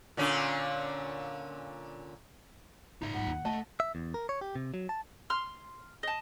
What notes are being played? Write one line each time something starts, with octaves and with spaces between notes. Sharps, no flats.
A#2 D3 C#4
G#2 C#3 D#4 E5
G#2 F#3 F#5
D#2
C#2 A3 D#5 A5
E5
E2
A#4
C#5
G4
C3
F#3
A5
C6 F6
D#5 A5